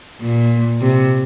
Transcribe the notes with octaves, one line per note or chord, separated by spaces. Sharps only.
A#2
C3